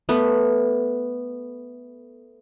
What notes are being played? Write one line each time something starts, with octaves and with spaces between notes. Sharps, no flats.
A3 B3 B4